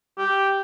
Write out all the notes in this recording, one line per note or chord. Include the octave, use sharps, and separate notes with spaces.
G4